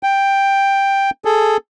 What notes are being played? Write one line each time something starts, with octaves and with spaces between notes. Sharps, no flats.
G5
G#4 A4